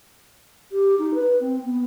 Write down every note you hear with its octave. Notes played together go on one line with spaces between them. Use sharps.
G4
D#4
B4
C4
B3